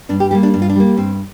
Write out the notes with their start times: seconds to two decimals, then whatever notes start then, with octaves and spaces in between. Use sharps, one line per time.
0.09 G2 D4
0.20 G4
0.31 G3 A#3 G4
0.43 D4
0.54 G2 D4
0.62 F4
0.70 D4
0.76 G3 A#3
0.97 G2 C4